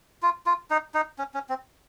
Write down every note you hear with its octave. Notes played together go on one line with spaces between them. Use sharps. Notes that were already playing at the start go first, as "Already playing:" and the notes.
F4
F4
D#4
D#4
C#4
C#4
C4